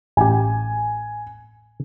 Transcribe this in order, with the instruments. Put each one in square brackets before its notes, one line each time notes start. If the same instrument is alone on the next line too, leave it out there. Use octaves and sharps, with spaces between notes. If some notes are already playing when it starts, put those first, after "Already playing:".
[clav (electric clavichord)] A1 G4 [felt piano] G#5